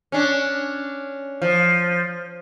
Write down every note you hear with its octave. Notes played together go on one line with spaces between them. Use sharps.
C#4 D4
F3